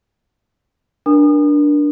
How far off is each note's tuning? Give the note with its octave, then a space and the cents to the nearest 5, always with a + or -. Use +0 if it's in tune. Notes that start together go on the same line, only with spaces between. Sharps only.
D4 +0 A#4 +30 D#6 -30